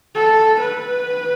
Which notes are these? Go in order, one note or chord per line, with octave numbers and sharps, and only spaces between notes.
A4
B4